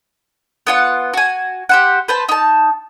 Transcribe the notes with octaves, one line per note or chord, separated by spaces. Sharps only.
B3 F4 F#5
F#4 G#5
G4 C5 F#5
B4 C5 A5
D#4 A5